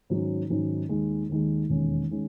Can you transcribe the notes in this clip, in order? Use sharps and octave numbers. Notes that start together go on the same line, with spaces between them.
G#2 D#3 F#3 C#4
G#2 D#3 F#3 C#4
D#2 D#3 G#3
D#2 D#3 G#3
E1 D#2 D#3 G#3 C#4
D#3 G#3 C#4